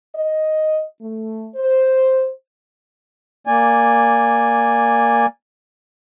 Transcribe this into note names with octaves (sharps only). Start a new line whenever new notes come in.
D#5
A3
C5
A#3 D5 G#5